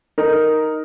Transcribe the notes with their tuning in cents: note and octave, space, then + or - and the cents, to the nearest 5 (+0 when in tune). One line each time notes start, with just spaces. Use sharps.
D#4 +0 A#4 +0